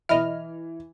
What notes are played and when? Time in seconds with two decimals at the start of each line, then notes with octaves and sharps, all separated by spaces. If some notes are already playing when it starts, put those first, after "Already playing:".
0.09 B1 E3 D#5 E5 B5 F6